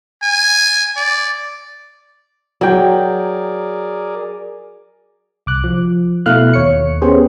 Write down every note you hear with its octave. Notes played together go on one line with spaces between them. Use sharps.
G#5
D5
F#3 G#4 A#4 D5 G5
C2 D6 F#6
F3
B2 A3 E4 F5 F6 F#6
D#2 C#5 C#7
B3 C#4 G4 G#4 C5